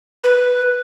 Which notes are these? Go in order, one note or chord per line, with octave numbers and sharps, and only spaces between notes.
B4